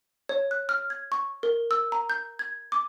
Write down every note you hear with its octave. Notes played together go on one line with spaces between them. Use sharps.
C#5
F#6
F6
G#6
C#6
A#4
E6
A#5
G6
G#6
D6